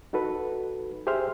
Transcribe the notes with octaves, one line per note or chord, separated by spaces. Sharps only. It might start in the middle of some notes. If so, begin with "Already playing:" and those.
D#4 F#4 A4 B4
G4 G#4 C5 E5 C6 F6